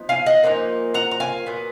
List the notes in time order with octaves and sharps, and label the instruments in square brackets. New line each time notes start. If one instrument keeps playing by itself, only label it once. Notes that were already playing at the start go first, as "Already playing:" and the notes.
Already playing: [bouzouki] F3 B3 D#4
F5 G#5
D#5 F#5
A#2 F3 A#3 D#4
F#5 A#5
A#5
F5 G#5
A#2 F#3 B3